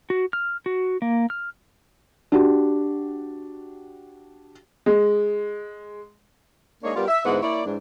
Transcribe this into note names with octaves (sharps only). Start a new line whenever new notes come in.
F#4
F6
F#4
A#3
F6
D4 F#4 G4
G#3
G#3 A#3 D4 D#4 G#4 C#5
G3 B3 F4 G4 A#4 D5
E5
D2 G#2 B3 E4 C5 F#5
A#3 E4 C#5 D5
G#2 E3 D4